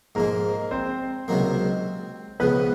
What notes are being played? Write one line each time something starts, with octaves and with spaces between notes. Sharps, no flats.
G#2 F3 G#3 A#3 A#4
C4 C5
C#2 C3 D#3 F#3 A#3
C#2 C#3 F3 B3 B4